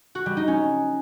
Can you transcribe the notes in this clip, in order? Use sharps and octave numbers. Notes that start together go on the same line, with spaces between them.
F#4
G3
D#4
C#4